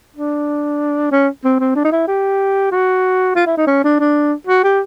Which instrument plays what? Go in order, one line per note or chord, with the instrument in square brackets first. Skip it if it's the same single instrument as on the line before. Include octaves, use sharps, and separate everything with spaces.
[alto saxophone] D4
C#4
C4
C4
D4
D#4
E4
G4
F#4
F4
E4
D#4
C#4
D4
D4
F#4
G4